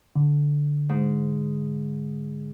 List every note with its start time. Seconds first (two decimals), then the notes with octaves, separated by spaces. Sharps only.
0.16 D3
0.89 G#2